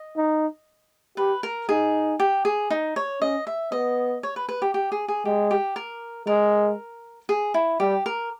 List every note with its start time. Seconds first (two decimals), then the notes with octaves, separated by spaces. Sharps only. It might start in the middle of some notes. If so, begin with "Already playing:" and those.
Already playing: D#5
0.16 D#4
1.17 G4 B4
1.43 A#4
1.69 D#4 G#4
2.20 G4
2.45 G#4
2.70 D#4
2.96 C#5
3.21 C#4 D#5
3.47 E5
3.72 B3 D#5
4.23 C#5
4.36 B4
4.49 B4
4.62 G4
4.74 G4
4.92 G#4
5.08 G#4
5.25 G#3 G4
5.51 G4
5.76 A#4
6.27 G#3 A#4
7.29 G#4
7.54 E4
7.80 G3 G4
8.06 A#4